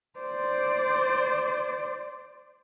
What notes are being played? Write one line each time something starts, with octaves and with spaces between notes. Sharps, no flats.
C5 D5